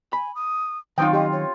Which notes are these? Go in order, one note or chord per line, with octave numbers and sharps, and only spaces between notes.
G#5 B5
D#6
D#3 F#3 C4 C#4 D#4 F4 G5 D#6
G4 D#5
C#5